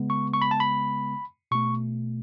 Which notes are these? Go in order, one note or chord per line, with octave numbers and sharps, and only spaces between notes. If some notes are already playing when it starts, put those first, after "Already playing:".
Already playing: C#3 G#3 B3
C#6
C#6
B5
A5
B5
B2 A3 C#6